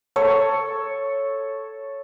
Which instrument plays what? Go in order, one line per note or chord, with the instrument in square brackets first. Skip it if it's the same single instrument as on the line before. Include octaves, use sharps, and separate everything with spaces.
[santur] A4 C#5